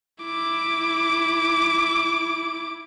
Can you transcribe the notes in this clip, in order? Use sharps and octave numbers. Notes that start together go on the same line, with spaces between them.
E4 D6